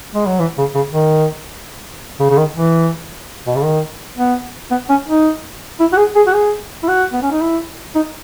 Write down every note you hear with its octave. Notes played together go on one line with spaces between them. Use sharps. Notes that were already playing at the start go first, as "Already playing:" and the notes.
G#3
F#3
E3
C#3
C#3
D#3
C#3
C#3
D#3
E3
B2
C#3
D#3
B3
B3
C#4
D#4
E4
F#4
G#4
G#4
F#4
G#4
E4
F#4
B3
C#4
D#4
E4
D#4